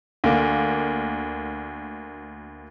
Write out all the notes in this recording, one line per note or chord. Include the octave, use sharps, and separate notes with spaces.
D2 A#3